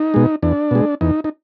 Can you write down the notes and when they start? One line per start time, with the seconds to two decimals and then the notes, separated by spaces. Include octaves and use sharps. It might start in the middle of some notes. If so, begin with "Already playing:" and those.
Already playing: D#4
0.14 B2 G#3
0.43 E2 D4
0.71 B2 G#3
1.01 E2 D#4
1.24 D#4